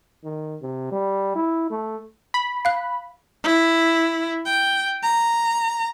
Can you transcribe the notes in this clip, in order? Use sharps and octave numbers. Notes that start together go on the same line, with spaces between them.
D#3
C3
G3
E4
A3
B5
F5 F#6
E4
G5
A#5